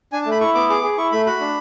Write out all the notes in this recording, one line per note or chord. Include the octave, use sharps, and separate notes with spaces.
D4 G#5
A5
A3
B5
E4 C#6
B3 D6
G#4 D6
G#4
E4 C#6
A3 B5
F#4 B5
D4